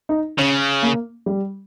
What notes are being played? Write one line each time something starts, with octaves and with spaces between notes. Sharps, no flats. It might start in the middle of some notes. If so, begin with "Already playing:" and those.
D#4
C#3 C#4
A#3
G3